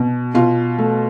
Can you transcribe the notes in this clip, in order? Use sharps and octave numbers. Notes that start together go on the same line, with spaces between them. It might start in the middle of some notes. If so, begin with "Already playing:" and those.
Already playing: B2
B2 F4
A3